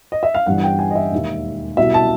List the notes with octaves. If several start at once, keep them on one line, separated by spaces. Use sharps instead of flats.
D#5
E5
F5
G1 G2 E3 F#5
G5
G#5
D#5
E5
E1 D#2 D#3
C2 B2 F#3 E5
A5